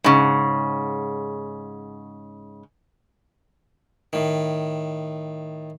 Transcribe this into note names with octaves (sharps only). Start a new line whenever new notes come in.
G#2 C#3
A2 D#3